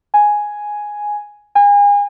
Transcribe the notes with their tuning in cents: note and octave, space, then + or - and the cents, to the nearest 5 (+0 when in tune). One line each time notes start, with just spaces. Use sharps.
G#5 +0
G#5 -35